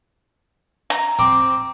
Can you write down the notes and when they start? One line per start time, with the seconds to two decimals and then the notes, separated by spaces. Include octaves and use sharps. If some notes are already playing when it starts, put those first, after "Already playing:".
0.90 A#5
1.19 C4 D6